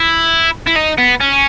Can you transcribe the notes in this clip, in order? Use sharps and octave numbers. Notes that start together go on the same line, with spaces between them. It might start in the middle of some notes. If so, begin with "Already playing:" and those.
Already playing: E4
E4
D#4
B3
C#4